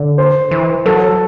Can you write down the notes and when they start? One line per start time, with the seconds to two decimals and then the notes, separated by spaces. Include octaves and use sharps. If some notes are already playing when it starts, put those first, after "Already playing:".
Already playing: D3
0.18 C5
0.51 E3
0.86 F#3 A4